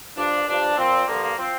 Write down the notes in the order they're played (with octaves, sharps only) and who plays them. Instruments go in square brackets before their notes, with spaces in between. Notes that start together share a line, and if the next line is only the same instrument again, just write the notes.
[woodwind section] G2 F3 D4
G2 F3 D4
A#2 F3 C4
G2 D3 F3 A#3
A#3
F3 C4